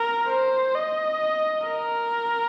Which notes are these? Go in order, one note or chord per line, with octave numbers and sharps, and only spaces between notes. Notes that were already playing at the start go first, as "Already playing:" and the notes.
Already playing: A#4
C5
D#5
A#4